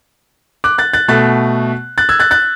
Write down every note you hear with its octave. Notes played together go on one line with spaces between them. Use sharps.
D6 F#6
F#6 A6
F#6 A6
B2 A3 F#6 A6
F#6 A6
E6 G#6
F#6 A6
F#6 A6